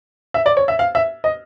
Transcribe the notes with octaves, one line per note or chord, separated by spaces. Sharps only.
E5
D5
C#5
E5
F5
E5
D#5